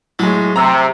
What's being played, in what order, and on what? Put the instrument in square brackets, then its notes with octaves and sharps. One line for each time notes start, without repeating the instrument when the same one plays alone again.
[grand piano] A2 G#3 [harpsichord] F#3
[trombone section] C3 [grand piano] A#5 E6